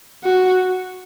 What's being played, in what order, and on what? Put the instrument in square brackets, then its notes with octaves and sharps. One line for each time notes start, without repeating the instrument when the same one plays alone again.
[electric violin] F#4